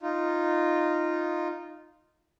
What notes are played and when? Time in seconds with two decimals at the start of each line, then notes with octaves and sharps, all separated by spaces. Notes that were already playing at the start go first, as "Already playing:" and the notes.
0.01 D#4 F4